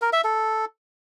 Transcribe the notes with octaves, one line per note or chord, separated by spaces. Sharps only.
A#4
E5
A4